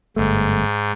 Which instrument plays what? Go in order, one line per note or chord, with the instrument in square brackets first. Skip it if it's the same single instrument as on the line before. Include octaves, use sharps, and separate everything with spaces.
[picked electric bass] G1 A3 [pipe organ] G#2